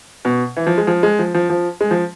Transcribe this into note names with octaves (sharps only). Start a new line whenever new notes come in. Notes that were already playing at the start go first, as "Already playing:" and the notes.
B2
E3
F3
G#3
F3
G#3
F3
F3
F3
G#3
F3